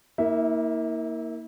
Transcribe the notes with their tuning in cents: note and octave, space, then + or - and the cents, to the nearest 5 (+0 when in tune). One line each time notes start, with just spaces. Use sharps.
A#3 +0 E4 -40 E5 +0